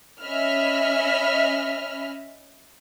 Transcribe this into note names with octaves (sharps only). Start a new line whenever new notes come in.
C#4 D#5 E5 B5 F6